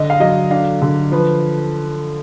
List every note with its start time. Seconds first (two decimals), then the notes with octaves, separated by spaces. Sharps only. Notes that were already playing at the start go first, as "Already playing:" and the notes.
Already playing: D3 D#5
0.10 F5
0.20 F#3 D#5
0.51 D4 F5
0.82 D3
1.12 F3 B4